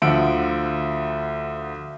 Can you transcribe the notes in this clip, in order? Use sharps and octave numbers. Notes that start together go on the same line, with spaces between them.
D2 F3 F#5 E6 D7